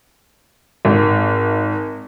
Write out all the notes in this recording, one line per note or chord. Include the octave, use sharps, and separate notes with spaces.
G#1